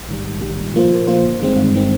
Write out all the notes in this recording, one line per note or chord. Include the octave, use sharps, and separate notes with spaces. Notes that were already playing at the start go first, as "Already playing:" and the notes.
Already playing: A#1
G#2 D#3 G3
A#1
G#2 D#3 G3
A#2
F3 A#3 F4 C5
A#2
F3 A#3 F4 C5
G1
G2 D#3 G#3 C4
G1
D#3 G#3 C4